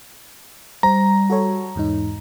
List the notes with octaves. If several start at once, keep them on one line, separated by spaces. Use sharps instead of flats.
G3 C5 A#5
F#4 A4 C#5
E2 G#2 D#4